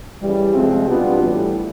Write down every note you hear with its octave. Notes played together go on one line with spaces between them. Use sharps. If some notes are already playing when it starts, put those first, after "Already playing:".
C#3 E3 G3
C3 F3 G#3 C4
B2 G3 B3 D4 F4
A2 E3 G3